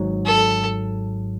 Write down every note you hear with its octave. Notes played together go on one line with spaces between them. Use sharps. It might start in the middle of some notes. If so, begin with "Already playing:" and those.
Already playing: G#1 G#2 F#3
A4